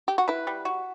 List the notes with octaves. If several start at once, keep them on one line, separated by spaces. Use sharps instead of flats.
G4
F#4
E4 B4
G3
F#4